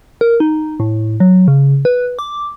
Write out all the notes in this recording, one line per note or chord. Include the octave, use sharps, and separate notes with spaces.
A#4
D#4
A2
F#3
C#3
B4
D6